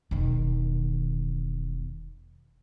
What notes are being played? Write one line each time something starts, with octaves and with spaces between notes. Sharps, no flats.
E1 D#3